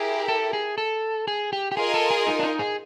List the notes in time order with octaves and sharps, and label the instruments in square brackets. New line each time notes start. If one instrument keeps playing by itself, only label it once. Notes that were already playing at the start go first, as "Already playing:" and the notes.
Already playing: [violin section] E4 G4 A#4 [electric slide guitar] G#4
[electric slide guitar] A4
G#4
A4
G#4
G4
G4
[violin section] F4 A#4 D#5 G#5 [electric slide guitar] G#4
[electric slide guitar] A4
G#4
D#4
D4
D#4
G#4